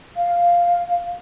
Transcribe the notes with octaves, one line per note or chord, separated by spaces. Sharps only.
F5